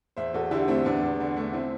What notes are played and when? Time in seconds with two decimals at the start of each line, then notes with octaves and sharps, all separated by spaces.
0.17 E2 C5 E5
0.34 E2 F#4 A4
0.51 D3 E4 G4
0.68 A3 C4 E4
0.85 E2 B3 D4
1.02 E2
1.20 D3
1.37 A3
1.53 C4 E4